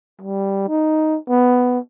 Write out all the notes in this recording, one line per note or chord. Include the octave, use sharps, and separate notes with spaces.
G3
D#4
B3